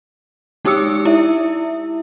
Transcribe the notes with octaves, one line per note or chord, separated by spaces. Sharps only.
G#3 D#4 G4 D#6 E6 C#7
E4 E5